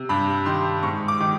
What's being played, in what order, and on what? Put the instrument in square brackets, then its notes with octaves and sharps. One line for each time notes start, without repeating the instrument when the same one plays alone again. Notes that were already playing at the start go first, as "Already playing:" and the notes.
Already playing: [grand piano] C3
G2 B5
D#3 C6
G#2 C#6
D6
D#3